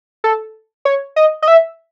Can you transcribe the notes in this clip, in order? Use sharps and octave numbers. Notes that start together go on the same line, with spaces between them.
A4
C#5
D#5
D#5
E5